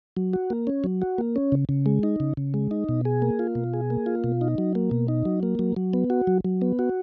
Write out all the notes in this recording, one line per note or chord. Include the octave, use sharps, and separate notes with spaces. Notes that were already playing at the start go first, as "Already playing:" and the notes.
F#3
F#4
A#3
C#4
F#3
F#4
A#3
C#4
C#3
C#3
G#3
D#4
C#3
C#3
G#3
D#4
B2
G#4
A#3
F4
B2
G#4
A#3
F4
B2
D#4
F#3
A#3
B2
D#4
F#3
A#3
F#3
F#3
B3
F#4
F#3
F#3
B3
F#4